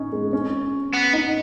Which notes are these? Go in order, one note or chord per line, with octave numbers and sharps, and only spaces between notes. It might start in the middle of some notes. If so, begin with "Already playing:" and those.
Already playing: C#4 D#4
G#3
C#4
B3
D#4